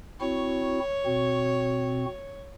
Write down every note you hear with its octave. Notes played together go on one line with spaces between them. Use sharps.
C4 E4 F#4 C#5
B2 C4 F#4